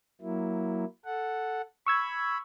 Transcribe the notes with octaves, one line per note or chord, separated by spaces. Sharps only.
F#3 A#3 E4
A4 F#5
B5 C#6 E6 G#6